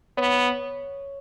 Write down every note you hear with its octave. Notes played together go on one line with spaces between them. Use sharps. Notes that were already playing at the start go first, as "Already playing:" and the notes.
B3 C#5